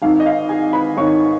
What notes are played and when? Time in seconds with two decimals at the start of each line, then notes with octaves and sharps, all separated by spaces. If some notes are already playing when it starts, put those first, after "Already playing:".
0.02 G#1 G#2 D#3 F5
0.20 D#5
0.26 F5
0.49 G#4 G#5
0.73 B4 B5
0.97 G#1 G#2 D#3 C#5 C#6